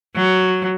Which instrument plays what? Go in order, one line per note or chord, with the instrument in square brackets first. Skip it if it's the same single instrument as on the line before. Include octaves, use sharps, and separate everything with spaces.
[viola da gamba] F#3